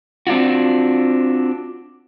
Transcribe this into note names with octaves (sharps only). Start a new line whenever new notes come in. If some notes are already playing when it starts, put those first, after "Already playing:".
C4 D4 F4 F#4